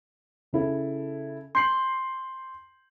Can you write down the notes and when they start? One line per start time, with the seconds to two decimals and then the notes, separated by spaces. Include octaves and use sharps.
0.53 C#3 E4 A4
1.55 C6 G6 C7 F#7